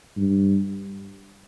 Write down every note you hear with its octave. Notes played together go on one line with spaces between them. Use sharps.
G2